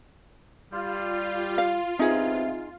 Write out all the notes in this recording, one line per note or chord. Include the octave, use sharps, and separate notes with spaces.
G3 F4
F5
G2 C3 B3 C4 D#4 G#4 E5